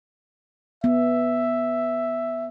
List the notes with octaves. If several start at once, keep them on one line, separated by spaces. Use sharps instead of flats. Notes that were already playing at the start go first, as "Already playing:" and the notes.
B3 E5